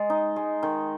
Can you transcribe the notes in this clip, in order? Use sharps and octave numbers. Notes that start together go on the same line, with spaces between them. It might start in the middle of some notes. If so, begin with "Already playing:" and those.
Already playing: G#3 D#5
D#4
G#3
D#3